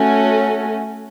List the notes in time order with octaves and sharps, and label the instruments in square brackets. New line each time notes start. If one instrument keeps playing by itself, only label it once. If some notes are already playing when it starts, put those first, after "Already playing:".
Already playing: [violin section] A3 C#4 F#4